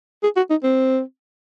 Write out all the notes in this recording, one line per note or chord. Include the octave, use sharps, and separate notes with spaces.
G#4
F#4
D#4
C4